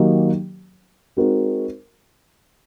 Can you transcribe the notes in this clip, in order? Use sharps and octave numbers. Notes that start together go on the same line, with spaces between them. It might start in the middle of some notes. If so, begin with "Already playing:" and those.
Already playing: D#3 F#3 A#3 D#4 G4
G#3 C4 D#4 F#4 A#4